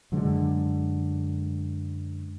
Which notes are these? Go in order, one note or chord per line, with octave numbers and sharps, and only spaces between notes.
F#2 D3 G#3